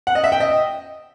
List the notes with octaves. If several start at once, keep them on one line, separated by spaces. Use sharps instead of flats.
F#5
D#5
E5
G5
D#5